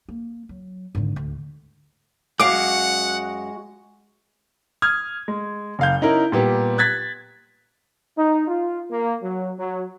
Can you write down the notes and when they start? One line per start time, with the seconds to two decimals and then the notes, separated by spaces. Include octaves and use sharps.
0.09 A#3
0.49 F#3
0.95 G#1 D3
1.16 D2
2.40 F#2 G#3 F#4 F5 F#5 D6
4.82 D#6 F6 G#6
5.28 G#3
5.79 F#1 F5 G6
6.01 C#4 D#4 E4 A#4
6.32 A#2 G3 B3 G4
6.78 F#6 G#6 A6 B6
8.17 D#4
8.48 F4
8.91 A#3
9.23 F#3
9.59 F#3